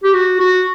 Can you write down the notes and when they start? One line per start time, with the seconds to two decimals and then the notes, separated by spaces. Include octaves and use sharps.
0.04 G4
0.14 F#4
0.40 F#4